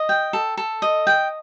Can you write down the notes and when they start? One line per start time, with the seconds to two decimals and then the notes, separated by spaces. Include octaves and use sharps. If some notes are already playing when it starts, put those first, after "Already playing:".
Already playing: D#5
0.09 G5
0.33 A4
0.57 A4
0.82 D#5
1.07 G5